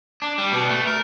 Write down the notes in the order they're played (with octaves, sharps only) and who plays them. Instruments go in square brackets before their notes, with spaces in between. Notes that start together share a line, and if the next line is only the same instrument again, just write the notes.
[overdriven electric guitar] D4
G3
B2
A3
A#4